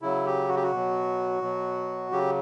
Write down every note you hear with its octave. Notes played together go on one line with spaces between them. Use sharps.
C#3 F#3 E4
G4
F#4
G4
F#4
B2 F#3
B2 F#3
C#3 F#3 G4